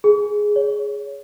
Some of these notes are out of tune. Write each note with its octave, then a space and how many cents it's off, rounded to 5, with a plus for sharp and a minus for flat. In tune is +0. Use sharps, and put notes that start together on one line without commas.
G#4 +5
C#5 +15